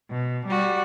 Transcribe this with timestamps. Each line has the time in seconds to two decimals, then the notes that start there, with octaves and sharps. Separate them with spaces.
0.11 B2
0.46 G3 F#4